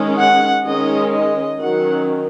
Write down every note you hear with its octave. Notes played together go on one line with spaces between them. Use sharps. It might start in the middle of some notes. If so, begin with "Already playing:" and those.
Already playing: D#3 G#3 C#4
F#5
D#3 G#3 C#4 D#5
D#5
D#3 F#3 C#4 F#5